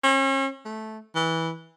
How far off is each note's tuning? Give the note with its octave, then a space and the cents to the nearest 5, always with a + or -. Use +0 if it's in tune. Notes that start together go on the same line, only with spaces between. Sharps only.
C#4 -40
A3 -10
E3 -15